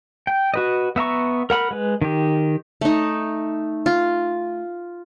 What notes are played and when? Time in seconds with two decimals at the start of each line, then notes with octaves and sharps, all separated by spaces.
0.27 G5
0.54 F#4 B4 D#5
0.96 B3 E5 A#5 C#6
1.50 A#4 F#5 B5
1.71 G#3 B4
2.02 D#3 G4
2.81 A3 D#4
3.86 F4